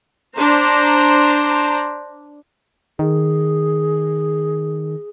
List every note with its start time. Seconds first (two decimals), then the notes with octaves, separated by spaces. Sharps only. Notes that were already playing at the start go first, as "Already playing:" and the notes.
0.35 D4 C5 A#5
2.99 D#3 G#4